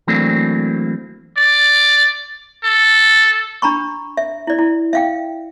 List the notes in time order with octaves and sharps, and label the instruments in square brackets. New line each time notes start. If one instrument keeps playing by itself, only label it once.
[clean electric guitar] E3 F#3 A3 A#3 C4 D4
[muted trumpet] D5
A4
[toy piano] D4 A#5 B5 C#6
E5
E4 D5
E4
E5 F5 G5